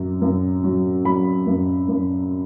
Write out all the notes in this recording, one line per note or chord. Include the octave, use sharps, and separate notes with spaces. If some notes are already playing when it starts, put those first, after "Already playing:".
Already playing: F#2 F#3
F#2
F#3
F#3 B5
F#2
F#2